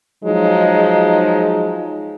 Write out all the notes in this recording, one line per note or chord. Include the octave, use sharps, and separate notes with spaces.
F3 F#3 G#3 D#4